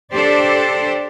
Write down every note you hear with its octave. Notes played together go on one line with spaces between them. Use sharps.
D4 G4 A4 C5 D5